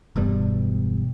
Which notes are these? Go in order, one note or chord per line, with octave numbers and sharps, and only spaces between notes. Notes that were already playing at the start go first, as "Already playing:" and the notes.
E1 G2 B2 G3